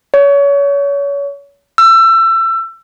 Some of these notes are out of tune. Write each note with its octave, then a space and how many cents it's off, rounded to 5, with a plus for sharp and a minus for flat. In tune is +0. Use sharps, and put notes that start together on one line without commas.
C#5 +30
E6 +25